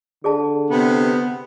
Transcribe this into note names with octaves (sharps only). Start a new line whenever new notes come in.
D3 G#4 D5 A5
C3 B3